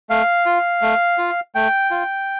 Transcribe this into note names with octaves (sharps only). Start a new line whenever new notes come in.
A3 F5
F4
A3
F4
A3 G5
F4